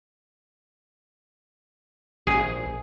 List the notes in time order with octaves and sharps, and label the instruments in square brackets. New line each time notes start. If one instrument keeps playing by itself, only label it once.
[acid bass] A#1 [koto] G#4